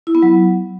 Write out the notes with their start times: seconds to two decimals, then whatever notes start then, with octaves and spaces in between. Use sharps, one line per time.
0.07 E4
0.15 B3
0.22 F#3